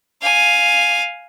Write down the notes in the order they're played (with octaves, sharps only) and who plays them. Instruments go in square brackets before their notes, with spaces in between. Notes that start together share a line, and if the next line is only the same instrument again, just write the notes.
[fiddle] F5 G#5